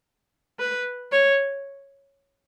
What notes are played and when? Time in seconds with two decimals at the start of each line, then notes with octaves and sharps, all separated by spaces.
0.59 B4
1.12 C#5